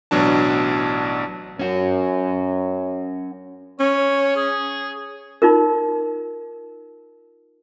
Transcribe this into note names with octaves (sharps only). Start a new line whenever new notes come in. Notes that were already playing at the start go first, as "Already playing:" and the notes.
A1 B2 F#3 D4 A5
F#2 C#4 F#4
C#4 C#5
G#4
D#4 F4 A#4